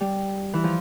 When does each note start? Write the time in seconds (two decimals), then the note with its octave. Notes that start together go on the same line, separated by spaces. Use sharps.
0.01 G3
0.54 E3
0.64 F3